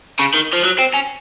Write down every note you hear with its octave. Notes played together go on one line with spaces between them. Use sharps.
C#3
D#3
F3
F#3
C4
C#4